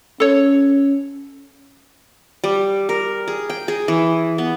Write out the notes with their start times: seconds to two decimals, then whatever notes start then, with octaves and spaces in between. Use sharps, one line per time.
0.20 C#4 A4 C#5
2.44 G3
2.89 A#4
3.28 G#4
3.50 G5
3.68 G#4
3.88 E3
4.38 B3